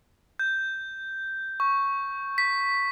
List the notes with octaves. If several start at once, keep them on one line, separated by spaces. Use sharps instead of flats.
G6
C#6
B6